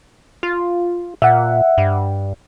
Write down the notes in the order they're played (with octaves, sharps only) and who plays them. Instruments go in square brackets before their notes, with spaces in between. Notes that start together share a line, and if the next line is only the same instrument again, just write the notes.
[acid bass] F4
[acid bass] A#2 [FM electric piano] E5 F#5
[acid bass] G2